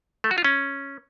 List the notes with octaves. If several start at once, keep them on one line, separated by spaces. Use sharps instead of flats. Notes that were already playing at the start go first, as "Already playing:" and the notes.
A3
F#4
F4
C#4